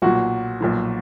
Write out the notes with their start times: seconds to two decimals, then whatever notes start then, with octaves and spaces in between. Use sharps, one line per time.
0.02 B1 A#2 F#3 F#4
0.60 B1 A#2 F3